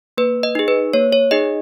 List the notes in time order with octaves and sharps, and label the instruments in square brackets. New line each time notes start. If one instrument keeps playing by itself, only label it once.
[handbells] A#3 B4
D#5
D#4 G#4
B4
A#3 C#5
C#5
D#4 G#4 D#5